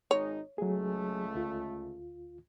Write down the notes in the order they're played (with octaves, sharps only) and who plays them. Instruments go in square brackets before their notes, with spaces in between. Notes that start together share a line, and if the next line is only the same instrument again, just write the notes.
[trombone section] G#1 G#3 D#4 [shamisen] C#5
[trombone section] C#2 A3 [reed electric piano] F#3 G#4
[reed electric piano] D2 F4